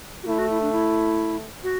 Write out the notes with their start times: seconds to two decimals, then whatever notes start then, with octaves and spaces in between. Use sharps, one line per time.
0.23 F#4
0.27 A3 E4
0.38 F#4
0.50 E4
0.62 D4
0.72 E4
1.64 F#4